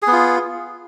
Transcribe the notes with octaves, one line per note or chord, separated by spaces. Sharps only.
B3 F4 G#4